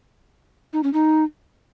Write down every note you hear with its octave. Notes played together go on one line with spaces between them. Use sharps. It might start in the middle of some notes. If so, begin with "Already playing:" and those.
D#4
C#4
D#4